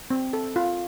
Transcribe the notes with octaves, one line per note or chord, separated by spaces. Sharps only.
C4
A4
F4